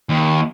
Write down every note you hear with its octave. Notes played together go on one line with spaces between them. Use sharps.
D#2